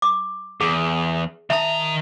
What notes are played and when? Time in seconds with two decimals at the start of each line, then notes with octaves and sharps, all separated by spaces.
0.02 D6
0.61 E2 G#4
1.50 D#3 E5 A5 A#5